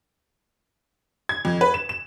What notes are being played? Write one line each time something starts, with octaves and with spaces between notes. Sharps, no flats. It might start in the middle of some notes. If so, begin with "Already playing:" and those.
G#6
F2
B4
E7
E7